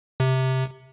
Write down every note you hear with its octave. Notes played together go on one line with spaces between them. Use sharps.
C3